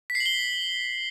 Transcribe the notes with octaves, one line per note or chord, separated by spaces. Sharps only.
B6
C7
F#7
G7